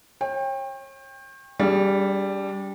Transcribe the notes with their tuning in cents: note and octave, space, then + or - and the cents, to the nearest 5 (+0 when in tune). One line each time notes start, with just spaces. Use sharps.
C#5 -35 G5 +25
G3 +0 D4 -40 G#4 +0